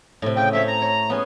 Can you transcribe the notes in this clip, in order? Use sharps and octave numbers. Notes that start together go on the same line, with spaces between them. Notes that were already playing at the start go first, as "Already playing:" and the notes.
A2 C3
C#3 G5
A3 C4 C#5 E5
A#5
C#5
B3 C#4 G#4